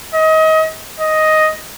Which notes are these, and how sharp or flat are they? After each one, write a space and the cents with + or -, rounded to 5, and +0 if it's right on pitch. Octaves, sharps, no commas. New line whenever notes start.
D#5 +30
D#5 +5